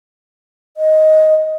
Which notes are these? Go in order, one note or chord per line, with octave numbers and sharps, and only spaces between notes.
D#5